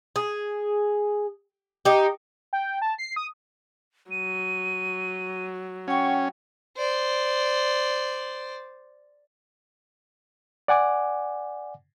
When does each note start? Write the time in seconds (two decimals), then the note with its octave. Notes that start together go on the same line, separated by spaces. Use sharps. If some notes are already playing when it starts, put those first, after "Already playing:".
0.16 G#4
1.85 D#4 G4
2.53 G5
2.82 A5
2.98 C7
3.16 D#6
4.11 F#3 D#7
5.88 C#4 F#5 G5 C#6
6.77 C5 D5
10.68 D5 F#5 G#5 D6